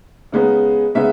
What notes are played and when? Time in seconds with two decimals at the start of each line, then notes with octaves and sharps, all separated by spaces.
0.32 C#3 G#3 B3 D#4
0.95 C#3 G#3 B3 D#4 E5